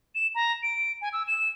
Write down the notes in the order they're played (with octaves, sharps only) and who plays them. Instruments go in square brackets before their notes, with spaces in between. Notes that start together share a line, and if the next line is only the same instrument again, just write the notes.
[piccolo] E7
A#5
D7
G#5
E6
E7